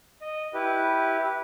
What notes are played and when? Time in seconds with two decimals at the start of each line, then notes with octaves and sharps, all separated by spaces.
0.22 D#5
0.54 E4 G4 B4